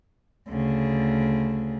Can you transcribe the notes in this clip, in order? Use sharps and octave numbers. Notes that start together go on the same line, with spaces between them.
D2 C#3